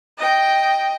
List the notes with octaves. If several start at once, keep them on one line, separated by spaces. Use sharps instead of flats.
D#5 G5